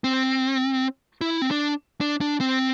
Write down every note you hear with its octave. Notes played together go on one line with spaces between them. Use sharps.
C4
E4
C4
D4
D4
D4
C4